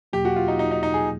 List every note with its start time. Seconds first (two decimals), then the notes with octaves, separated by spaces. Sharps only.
0.13 E2 B2 F#3 A#3 G4
0.25 F#4
0.36 F4
0.48 D#4
0.59 D#4
0.71 D#4
0.83 D#4
0.94 G#4